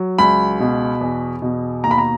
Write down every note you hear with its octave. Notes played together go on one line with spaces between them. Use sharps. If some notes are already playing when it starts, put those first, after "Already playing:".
Already playing: F#3
C#2 B5
B2
E2
B2
D#2 A#5
B5
A#5